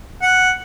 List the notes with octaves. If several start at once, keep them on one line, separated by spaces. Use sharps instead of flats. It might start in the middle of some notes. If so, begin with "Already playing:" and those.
F#5